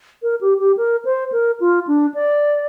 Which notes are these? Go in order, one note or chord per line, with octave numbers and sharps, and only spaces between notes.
A#4
G4
G4
A#4
C5
A#4
F4
D4
D5